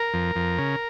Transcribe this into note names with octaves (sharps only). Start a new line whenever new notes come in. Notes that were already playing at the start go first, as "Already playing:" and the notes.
Already playing: A#4
F2
F2
C#3